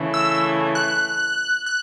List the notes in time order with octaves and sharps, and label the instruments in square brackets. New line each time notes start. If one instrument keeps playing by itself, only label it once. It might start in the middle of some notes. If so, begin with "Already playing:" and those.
Already playing: [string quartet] C#3 E3 A3
[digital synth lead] E6
F#6
F#6